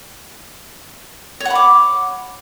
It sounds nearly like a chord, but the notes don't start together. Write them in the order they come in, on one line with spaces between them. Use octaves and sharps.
C#5 F#5 B5 D6